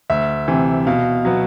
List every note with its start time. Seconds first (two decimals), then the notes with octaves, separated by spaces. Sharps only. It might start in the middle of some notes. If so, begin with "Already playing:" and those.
0.10 D2 E5
0.48 C3 E3
0.87 B2 F5
1.25 F#3 B3